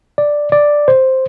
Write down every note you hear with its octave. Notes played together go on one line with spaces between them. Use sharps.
D5
D5
C5